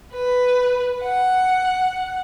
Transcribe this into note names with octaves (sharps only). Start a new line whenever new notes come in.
B4
F#5